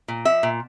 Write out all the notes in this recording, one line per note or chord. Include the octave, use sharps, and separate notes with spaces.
A#2
F3 E5
A#2